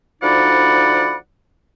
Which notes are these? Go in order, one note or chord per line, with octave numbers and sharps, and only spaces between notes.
D2 F3 D#4 D5 F#5 B5